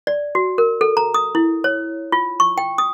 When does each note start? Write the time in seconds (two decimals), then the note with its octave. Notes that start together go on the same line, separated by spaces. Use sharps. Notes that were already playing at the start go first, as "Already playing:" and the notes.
0.07 D5
0.35 F#4
0.58 A#4
0.81 A4
0.97 A#5
1.14 D#6
1.35 E4
1.64 C#5
2.12 F4
2.40 C#6
2.58 G5
2.78 D#6